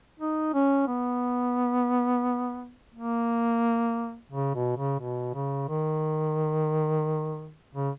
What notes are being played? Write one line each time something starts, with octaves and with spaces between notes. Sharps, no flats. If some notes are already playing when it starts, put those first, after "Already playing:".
D#4
C#4
B3
A#3
C#3
B2
C#3
B2
C#3
D#3
C#3